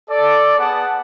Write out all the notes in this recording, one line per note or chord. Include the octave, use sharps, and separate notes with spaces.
A4 D5
B3 G#4 F#5 A5